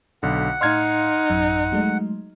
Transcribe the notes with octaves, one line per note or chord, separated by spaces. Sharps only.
B1 D3 F#5
A2 D#4 F5 C6 F6 G#6
A1 F#2 E6
F#3 G#3 A3